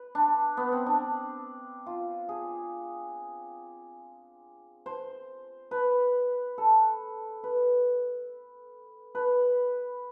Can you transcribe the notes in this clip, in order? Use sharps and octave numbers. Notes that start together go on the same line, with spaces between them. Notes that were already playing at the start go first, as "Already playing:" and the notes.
Already playing: B4
D4
B3
C4
D4
F4
G#4
C5
B4
A4
B4
B4